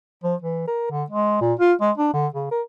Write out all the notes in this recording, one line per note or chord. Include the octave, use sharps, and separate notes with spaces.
F3
E3
A#4
D3
G#3
A#2
F4
G#3
D4
D3
C#3
A#4